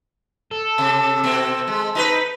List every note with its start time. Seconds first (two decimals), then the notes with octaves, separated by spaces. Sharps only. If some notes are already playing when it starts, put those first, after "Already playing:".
0.51 A4
0.78 C3
1.24 B2 C4
1.68 G#3
1.95 D#4 G4 B4